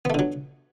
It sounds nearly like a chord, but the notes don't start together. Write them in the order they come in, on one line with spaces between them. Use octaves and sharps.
B3 A3 D3 F#3